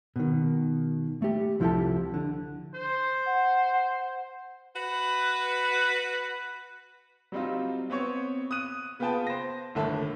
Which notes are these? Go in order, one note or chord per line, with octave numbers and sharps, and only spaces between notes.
B2 D#3
A3 G4
C2 F3 E4 G4 A4 A5
D3
C5
F#5
F#4 B4
F#3 G3 C4 D#4 F4
B3 C4 C#5 C#6
D#6 F#6 D#7
C#3 B3 F4 B4 G5 A5
C5 A#6
G1 A2 D3 D#3 E5 A5